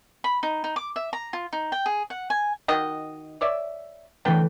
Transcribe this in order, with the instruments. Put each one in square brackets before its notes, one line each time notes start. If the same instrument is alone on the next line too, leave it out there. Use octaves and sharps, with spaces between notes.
[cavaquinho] B5
D#4
D#4
D6
E5
A#5
F4
D#4
G5
G#4
F#5
G#5
[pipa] D#3 F#4 D#5
C#5 D5 E5
[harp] E3 A3 [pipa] B3 D4 G5